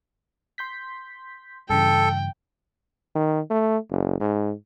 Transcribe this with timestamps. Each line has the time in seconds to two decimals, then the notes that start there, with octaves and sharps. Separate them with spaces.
0.58 C6 G6 B6
1.70 G2 C#3 E3 A4 G5
3.15 D#3
3.50 A3
3.90 F#1
4.20 G#2